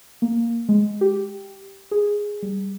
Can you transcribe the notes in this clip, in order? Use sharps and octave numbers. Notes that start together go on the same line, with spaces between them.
A#3
G#3
G4
G#4
G3